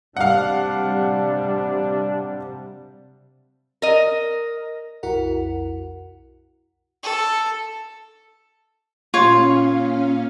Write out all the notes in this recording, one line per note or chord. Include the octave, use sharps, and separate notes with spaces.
C3 G3 D4 F5 F#5
A#4 D#5
B1 F2 E4 F#4 A#4 F#5
A4
A#2 C#4 F4 C#5 F5